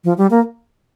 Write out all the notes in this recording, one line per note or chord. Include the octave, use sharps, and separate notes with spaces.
F3
G3
A#3